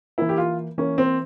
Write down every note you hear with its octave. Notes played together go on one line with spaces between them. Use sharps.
E3 A#3 E4
G4
F4
E3 A#3 C#4
C4